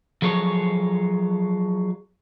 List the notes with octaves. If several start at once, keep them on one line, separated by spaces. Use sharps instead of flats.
F3 F#3 G#4 A4 C#5